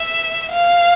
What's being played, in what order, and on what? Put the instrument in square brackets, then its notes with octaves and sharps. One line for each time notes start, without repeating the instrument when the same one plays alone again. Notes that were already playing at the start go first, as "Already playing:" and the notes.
Already playing: [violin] E5
F5